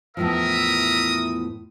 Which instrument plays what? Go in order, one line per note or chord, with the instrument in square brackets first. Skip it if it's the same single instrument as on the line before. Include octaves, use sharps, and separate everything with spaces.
[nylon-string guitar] E2 A2 F3 [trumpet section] A#4 E5 [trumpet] D#6